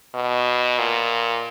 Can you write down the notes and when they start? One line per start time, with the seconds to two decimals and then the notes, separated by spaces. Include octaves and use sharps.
0.14 B2
0.79 A#2